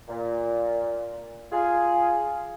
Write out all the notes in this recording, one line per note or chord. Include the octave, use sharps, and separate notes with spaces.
A#2
F4 G#4